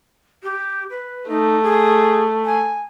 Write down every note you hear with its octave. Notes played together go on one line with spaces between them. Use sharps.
G4
B4
A3 D#4
G#4
G#5